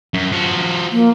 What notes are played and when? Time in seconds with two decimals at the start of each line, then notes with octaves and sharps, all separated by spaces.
0.14 F#2
0.32 F3 F#4
0.92 A#3